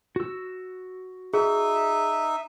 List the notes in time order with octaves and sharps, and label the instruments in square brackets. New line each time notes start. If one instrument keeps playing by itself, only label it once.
[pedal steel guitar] F#4 E6
[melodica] D#4 E5 [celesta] G#4